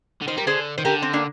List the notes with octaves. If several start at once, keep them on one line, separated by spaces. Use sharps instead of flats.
D3
D#3 C5
G3 A#4
D3 G#4 C5
D#3 C5
D3 G4 A#4
C4
A#3 D4